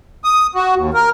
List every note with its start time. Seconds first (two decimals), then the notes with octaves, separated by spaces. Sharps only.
0.24 D#6
0.55 F#4
0.76 D#2
0.94 A#4